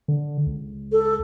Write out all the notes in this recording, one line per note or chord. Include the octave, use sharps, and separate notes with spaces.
D3
C#2
A4